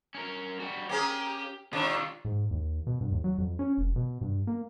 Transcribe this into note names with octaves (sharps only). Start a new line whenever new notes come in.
C#4 A#4
G3 F#4
A#3 C#4 G4 G#4
C3 D#3 D4 F4 C#5
G#2
D#2
B2
G2
D#2
F#3
F2
C#4
F1
B2
G2
A#3